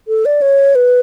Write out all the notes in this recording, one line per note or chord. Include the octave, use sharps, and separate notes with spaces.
A4
D5
C#5
B4